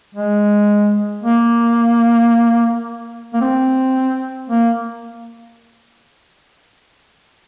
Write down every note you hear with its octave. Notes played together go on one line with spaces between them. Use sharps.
G#3
A#3
A#3
C4
A#3